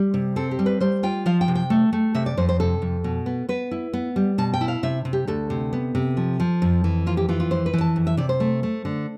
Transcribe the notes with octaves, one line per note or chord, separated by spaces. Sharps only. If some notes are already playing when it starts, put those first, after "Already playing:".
Already playing: G3
C3
C4 A4
G4
G3
B4
G3 C5
F4 G5
F3 F5
G5
C3
G5
A3
A3
C3 E5
D5
F2 C5
C5
C3 A4
F2
B2
B3
B3 B4
E4
B3
G3
B2 A5
G5
E4
F5
C3 E5
C3
G4
D2 A4
C3
B3
C3
F3
F3
F2
E3
F2 F4
G4
E3 F4
F4
F2 C5
B4
E3
A5
F2
E5
C3 D5
C5
A3
A3
D3